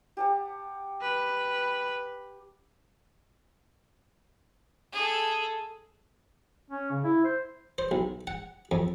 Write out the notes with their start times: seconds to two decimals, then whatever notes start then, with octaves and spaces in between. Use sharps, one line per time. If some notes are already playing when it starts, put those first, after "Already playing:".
0.17 G4 F#5 A5
1.02 B4
4.93 G#4 A4
6.70 C#4
6.91 C#3
7.04 E4
7.24 C5
7.78 C5
7.91 B1
8.27 F#5
8.71 F2